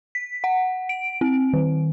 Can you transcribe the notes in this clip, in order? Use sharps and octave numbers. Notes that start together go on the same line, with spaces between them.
B6
F#5
D7
C4
D#3